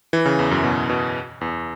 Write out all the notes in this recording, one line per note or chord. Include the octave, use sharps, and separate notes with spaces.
E3
C#3
E2
F#2
B2
B2
E2